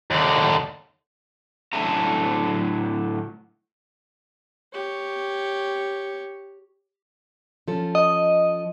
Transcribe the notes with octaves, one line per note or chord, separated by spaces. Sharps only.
D#2 D3
A2 D3 F#3 A4 E5 A#5
G4 C#5
F3 C#4 A4
D#5